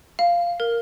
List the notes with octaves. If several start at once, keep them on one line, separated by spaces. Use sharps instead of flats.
F5
A#4